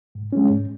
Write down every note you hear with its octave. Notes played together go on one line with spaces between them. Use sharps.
G#2
G#3 C#4
G#2